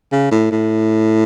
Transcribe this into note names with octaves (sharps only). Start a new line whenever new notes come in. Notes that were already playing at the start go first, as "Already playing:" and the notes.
C#3
A2
A2